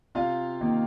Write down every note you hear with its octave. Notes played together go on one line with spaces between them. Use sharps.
C3 F4 F5
D#3 A#3 D#4